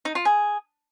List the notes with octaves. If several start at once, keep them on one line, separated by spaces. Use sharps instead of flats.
D#4
F4
G#4